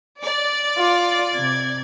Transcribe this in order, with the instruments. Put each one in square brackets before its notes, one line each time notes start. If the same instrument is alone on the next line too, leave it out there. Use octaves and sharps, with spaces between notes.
[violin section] D5
[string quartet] F4
C3 G#6